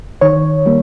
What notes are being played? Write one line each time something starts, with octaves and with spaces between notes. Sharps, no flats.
D#3 C#5
G3 A#3